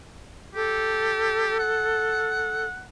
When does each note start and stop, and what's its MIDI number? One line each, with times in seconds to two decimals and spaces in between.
0.55 1.56 67
0.55 2.65 69
1.59 2.84 78